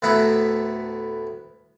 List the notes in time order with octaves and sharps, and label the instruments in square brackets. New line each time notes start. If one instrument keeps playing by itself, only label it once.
[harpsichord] D2 A2 B3 E4 A#5 B5